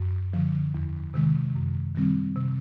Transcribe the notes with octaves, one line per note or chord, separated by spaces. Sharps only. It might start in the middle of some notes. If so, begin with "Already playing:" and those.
Already playing: F#2
D3 F3
E2
C3 D#3 G#3
F#2
D#3 G3 C4
C3